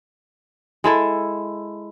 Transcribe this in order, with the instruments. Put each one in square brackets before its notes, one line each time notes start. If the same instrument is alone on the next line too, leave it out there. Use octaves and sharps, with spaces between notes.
[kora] G#3 E4 A4